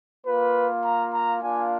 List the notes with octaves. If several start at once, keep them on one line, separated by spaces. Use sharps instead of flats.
A#3 F4 B4
A#5
A#5
A#3 D4 F4 G#5